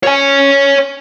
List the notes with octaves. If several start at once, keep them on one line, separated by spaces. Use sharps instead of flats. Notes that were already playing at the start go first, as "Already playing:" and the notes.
C#5 G#5